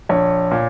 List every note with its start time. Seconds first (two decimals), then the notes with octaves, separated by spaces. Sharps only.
0.09 A#1 C#5
0.51 A#2